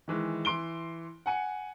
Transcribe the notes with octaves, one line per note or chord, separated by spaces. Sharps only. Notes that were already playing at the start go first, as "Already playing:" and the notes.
D#3 E3 G#3
E3 C6 D7 G7
F#5 G#5 C#7